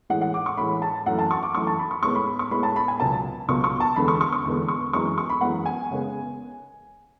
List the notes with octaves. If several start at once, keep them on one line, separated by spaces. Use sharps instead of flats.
A2 E3 G#3 F#5
F#5
D6
C#6
A2 E3 G#3 B5
A5
F#2 E3 A3 F#5
A5
C#6
D6
F#2 E3 A3 C#6
A5
B5
C#6
A2 G#3 B3 C#6
B5
C#6
A2 G#3 B3 B5
A5
B5
G#5
C#2 B2 F#3 B3 A5
C#2 B2 F#3 B3 C#6
C#6
A5
E2 D3 G#3 B3 B5
C#6
C#6
C#6
E2 D3 G#3 B3
C#6
F#2 E3 G#3 B3 C#6
C#6
B5
F#2 E3 G#3 B3 F#5
G#5
C#3 G#3 B3